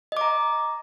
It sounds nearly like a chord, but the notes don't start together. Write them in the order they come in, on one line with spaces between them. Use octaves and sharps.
D#5 D6 A#5